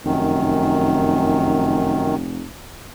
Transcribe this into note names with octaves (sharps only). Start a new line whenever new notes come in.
F1 F#2 D#3